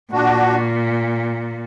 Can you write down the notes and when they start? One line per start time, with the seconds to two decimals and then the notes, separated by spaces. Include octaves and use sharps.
0.12 A#2 D4 F#4